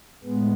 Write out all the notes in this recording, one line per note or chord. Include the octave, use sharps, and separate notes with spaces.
A2 G#3 B3